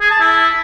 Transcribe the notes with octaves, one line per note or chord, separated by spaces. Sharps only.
G#4
A5
E4